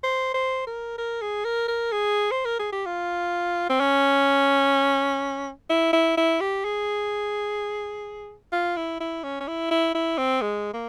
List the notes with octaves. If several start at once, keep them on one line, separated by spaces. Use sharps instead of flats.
C5
C5
A#4
A#4
G#4
A#4
A#4
G#4
C5
A#4
G#4
G4
F4
C4
C#4
E4
E4
E4
G4
G#4
F4
E4
E4
C#4
C#4
E4
E4
E4
C4
G#3
A#3